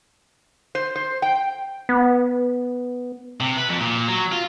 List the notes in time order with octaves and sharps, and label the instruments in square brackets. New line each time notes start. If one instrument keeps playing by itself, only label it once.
[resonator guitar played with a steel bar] C5
C5
G5
[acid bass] B3
[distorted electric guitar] C3
B4
F2
A#2
F#3
F4